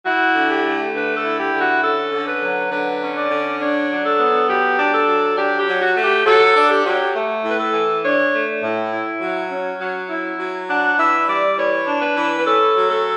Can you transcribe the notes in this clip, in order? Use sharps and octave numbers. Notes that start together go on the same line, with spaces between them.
E4 F#4
D3
G4
A3
D3 B4
A4
E4
G4
D3
F#4
C#4 A4
D3
B4
F#3
D3 B4
C#4
D5
D3
D4 C#5
F#3
A4
B3
F#3 G4
D4
A4
F#3
D4 G4
G4
F#3
F#4
A3
G4
F#3 A4
D4
G4
F#3
A3
A2
B4
A4
E3
D4 C#5
A3
A2
E4
F#3
C#4
F#3
E4
F#3
D4 F#5
E3 E5
G3 D5
E3 C#5
D4
B4
E3
B4
C#4 A4
F#3
A4